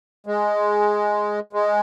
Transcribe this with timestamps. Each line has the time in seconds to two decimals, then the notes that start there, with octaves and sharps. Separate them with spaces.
0.27 G#3
1.53 G#3